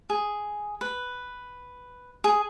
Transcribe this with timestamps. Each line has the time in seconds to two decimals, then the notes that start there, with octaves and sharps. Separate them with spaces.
0.10 G#4
0.81 B4
2.24 G#4